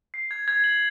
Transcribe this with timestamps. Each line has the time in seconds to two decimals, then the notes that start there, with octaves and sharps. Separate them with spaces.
0.14 C7
0.31 G#6
0.48 G#6
0.64 F#7